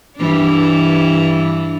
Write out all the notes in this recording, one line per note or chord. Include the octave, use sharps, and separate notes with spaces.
G2 E3 D4